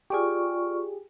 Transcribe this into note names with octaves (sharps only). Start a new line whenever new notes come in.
F4 G4 G#4 D5 C#6